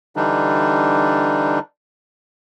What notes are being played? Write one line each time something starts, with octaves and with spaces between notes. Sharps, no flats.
D3 E3 G3 D4 D#4